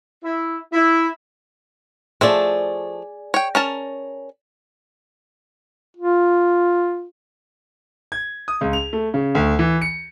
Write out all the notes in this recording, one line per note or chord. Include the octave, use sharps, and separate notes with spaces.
E4
E4
F3 A3 G#4 D5
C#5 G5
C#4 A#4 A5
F4
G#6
D#6
C#2
F7
A3
C#3
D2
E3
C#7